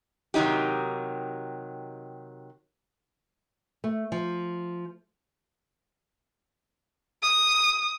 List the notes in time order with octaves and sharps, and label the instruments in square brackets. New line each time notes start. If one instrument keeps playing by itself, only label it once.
[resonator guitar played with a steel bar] C3 D#3 F#3 D#4 G4
[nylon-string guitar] A3
F3
[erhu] D#6